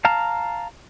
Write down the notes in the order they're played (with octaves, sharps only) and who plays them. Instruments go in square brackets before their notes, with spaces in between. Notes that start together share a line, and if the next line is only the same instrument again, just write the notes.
[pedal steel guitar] F5 A5 A#5 F6